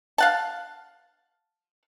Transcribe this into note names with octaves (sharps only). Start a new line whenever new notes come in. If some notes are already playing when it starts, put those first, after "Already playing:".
F5 F#5 A5